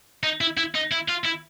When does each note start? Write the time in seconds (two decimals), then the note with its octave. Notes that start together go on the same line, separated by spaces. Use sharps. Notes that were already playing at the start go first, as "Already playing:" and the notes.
0.23 D#4
0.41 E4
0.57 E4
0.75 D#4
0.92 E4
1.09 F4
1.25 E4